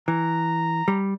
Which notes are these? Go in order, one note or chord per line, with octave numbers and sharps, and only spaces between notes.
E3 A#5
G3